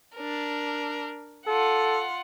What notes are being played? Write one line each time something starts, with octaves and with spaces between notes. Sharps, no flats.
D4 A#4
F4 A4 F#5